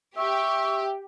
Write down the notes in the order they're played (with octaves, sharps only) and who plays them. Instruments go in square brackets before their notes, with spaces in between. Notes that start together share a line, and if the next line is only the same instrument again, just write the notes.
[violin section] G4 [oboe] E5 [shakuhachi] C#6